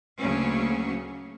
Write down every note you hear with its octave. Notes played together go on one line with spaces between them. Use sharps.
D2 C#3 F#3 A3 A#3 C#4